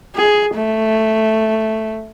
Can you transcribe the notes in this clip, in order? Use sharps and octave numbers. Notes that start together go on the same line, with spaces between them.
G#4
A3